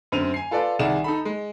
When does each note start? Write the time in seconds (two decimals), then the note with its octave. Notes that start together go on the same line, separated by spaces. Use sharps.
0.12 F#2 D3 C4 D#7 F7
0.34 G#5 C7
0.51 F4 A4 B4 D5
0.79 C2 D#3 G#4 D5 F#5 E7
1.04 D#4 A4 B5
1.25 G#3